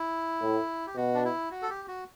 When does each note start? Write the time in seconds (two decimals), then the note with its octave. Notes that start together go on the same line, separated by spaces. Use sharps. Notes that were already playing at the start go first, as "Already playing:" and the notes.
Already playing: E4
0.42 A2
0.87 G4
0.96 B2 F#4
1.14 D4
1.25 E4
1.51 F#4
1.62 A4
1.70 G4
1.88 F#4